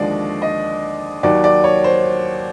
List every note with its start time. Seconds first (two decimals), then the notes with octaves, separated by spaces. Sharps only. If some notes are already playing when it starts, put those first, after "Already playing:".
Already playing: D#2 D3 F3 G#3 D5
0.42 D#5
1.23 D#2 D#3 F#3 D5
1.44 D5
1.64 C#5
1.84 C5